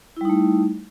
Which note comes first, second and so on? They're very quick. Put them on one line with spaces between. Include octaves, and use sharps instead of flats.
E4 G3 D#4 A3